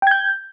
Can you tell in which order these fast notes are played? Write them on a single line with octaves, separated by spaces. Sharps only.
G5 G#6 G6